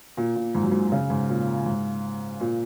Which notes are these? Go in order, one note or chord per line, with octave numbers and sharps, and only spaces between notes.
A#2
A#2
G#2
F#2
G#2
C#3
G#2
A#2
G#2
A#2